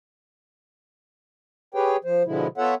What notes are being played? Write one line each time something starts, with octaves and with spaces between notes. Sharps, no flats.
G4 G#4 B4 C#5 G5
F3 C5
B2 D3 F3 G#3 E4
B3 F4 A4 C#5 E5 F#5